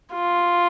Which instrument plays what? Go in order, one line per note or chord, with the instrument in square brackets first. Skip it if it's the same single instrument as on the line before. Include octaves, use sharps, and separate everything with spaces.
[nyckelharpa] F4